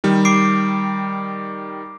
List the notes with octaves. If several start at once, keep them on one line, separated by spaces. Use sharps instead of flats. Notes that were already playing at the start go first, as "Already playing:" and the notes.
D#3 G3
D6 C7 D7